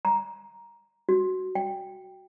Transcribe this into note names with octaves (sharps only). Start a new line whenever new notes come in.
A#5
F#4
G5